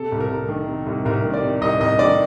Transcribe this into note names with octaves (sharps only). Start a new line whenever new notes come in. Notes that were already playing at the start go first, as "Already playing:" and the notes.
Already playing: C3 A4
C2
A#4
C2
D#3
C3
C2
C2 A#4
D#3
D5
C3
C2 D#5
C2 D#5
D#3 D5